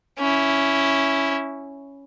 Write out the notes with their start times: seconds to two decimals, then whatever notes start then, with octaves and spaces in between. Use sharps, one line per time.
0.19 C#4 E4